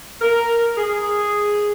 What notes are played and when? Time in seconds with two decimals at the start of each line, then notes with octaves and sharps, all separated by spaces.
0.21 A#4
0.77 G#4